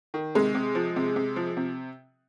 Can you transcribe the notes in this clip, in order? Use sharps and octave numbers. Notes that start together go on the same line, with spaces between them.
D#3
C3 G#3
C3
F3
C3
C3
F3
C3